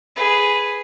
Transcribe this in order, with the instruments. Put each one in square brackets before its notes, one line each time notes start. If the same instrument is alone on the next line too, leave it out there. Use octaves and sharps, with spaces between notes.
[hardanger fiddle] G#4 B4